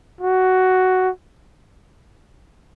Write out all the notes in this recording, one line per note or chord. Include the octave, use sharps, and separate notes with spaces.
F#4